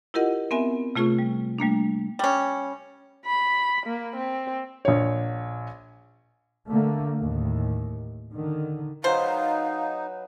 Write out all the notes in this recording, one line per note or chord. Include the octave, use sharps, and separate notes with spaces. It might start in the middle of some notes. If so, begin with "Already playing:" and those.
E4 F4 G4 A#4 D#5 F#5
B3 C4 A#4 E5 G#5
C3 A3 F4 G#4 C#6
G3
G3 A3 A#3 D4
G3 C#4
B5
A#3
C4
A#1 C#5
D3 A3 A#3
D#2 A2
D3 D#3
F#3 D#4 B4 C5 F5 G#5